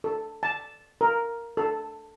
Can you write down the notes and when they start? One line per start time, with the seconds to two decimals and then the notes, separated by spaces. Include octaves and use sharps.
0.04 A4
0.43 A5
1.01 A#4
1.57 A4